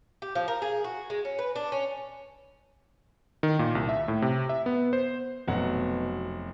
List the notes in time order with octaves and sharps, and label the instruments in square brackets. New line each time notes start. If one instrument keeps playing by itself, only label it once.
[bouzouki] G4
F3
A#4
G#4
F#4
G#3
C#4
B4
D4
C#4
[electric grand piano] D#3
A#2
C2
E5
A2
C3
E5
B3
C5
[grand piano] F1 F#3 F#5 [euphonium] B2